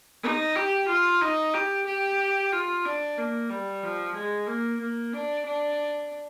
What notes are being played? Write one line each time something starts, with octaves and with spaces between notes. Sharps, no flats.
D#4
G4
F4
D#4
G4
G4
F4
D4
A#3
G3
F3
G#3
A#3
A#3
D4
D4